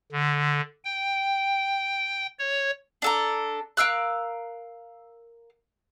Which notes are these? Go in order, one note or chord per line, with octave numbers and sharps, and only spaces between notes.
D3
G5
C#5
D4 A4 A#5
A#4 F5 E6 F#6